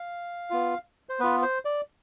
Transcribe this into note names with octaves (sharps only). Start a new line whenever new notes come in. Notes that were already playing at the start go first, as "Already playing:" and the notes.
Already playing: F5
B3 F4
C5
B3 F4 B4
C5
D5